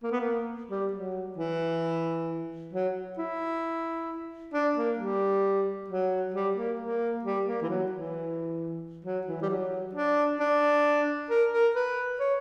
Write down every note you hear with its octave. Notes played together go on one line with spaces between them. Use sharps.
A#3
B3
A#3
G3
F#3
E3
F#3
E4
D4
A#3
G3
F#3
G3
A#3
A#3
G3
A#3
E3
F#3
E3
F#3
E3
G3
F#3
D4
D4
A#4
A#4
B4
C#5